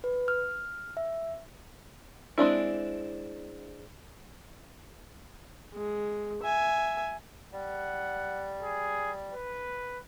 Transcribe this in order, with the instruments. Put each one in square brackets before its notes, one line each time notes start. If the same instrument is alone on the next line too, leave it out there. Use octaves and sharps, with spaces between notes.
[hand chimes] B4
F6
E5
[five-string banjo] G#3 C4 D4 E4
[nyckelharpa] G#3
E5 G#5
[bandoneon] G3 [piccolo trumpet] F#5
[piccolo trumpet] G#4
B4